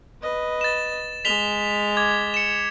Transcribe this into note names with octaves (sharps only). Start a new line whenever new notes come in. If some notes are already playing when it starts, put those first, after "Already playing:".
B4 D#5
A6 E7
G#3 B6 F7 G7
D6 G#6
C#7 E7